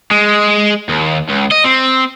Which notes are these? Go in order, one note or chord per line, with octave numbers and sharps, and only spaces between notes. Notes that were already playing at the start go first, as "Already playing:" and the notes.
G#3
D#2
C#2
D#5
C4